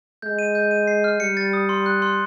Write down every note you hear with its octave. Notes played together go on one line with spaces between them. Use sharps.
G#3 G6
D#7
G6
D#7
C7
F6
G3 C#7
A6
D#6
C6
F#6
C6